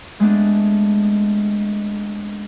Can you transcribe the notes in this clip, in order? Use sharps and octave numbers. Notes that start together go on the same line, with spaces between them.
G#3 A3 B3 D4